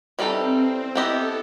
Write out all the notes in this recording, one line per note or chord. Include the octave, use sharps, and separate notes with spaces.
E3 G3 C4 D#4 A4
B3 E4 G4 A4 D#5